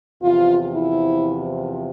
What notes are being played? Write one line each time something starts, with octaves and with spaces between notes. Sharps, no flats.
E2 C3 F3 F4
E4